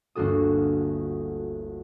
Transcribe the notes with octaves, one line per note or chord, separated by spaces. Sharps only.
G1 D2 A#3 F#4 A4 D#6